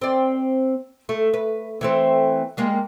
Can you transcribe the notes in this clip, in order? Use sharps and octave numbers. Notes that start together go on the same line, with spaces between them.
C4 D5
A3
B4
E3 A3 C4
G3 G#3 A#3